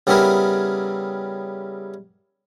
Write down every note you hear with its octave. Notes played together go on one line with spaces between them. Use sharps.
C#3 G3 B3 E4 G#4 A#4